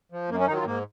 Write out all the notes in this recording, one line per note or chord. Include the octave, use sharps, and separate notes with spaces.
F3
F#2 A#3
C#4
D#3 F#3 D#4
F4
G#2 A#3